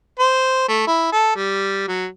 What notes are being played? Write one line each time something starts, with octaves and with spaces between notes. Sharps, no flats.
C5
A3
E4
A4
G3
F#3